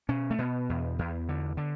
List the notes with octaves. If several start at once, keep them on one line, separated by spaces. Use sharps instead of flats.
B2 C#4
A3
B2 B3
E2
E2
D3
D3